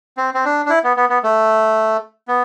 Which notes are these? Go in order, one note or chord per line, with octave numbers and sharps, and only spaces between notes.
C4
C4
D4
D4
E4
B3
B3
B3
A3
B3